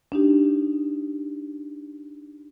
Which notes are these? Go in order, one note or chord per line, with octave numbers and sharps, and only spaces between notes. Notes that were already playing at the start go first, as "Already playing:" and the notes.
D4 D#4 G4